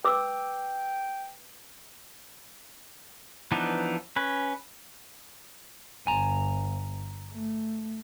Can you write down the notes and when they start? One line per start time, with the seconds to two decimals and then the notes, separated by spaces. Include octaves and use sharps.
0.05 B4 G5 D6 E6
3.52 E3 F3 B3 D4 D#4
4.16 C#4 B4
6.07 G1 G#5 A#5
7.33 A3